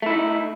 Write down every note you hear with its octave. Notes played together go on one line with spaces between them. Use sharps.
A3 D#4 E4